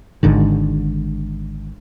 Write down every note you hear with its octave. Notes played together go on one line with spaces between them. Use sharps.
G#1 G#2 D3 D#3